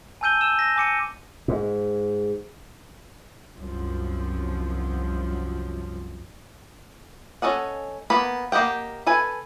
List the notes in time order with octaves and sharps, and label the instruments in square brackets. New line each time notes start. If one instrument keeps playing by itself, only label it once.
[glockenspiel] G#5 A5 E6 G6 D#7 G7
E6 E7
A#6
G#5 D6 C#7 D#7
[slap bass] G#2
[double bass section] C2 F#2 F3
[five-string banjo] C#4 A4 D#5 F#5
A#3 B3 B5
A#3 G4 D#5 F#5 G5
A4 B4 G#5